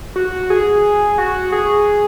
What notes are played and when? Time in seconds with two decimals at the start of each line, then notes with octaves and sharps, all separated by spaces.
0.16 F#4
0.50 G#4
1.18 F#4
1.52 G#4